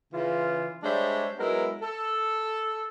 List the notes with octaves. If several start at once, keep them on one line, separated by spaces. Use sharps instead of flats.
C#3 E3 F4
G3 G#3 D4 C5 C#5 E5
F#3 G#3 B3 E4 A#4
A4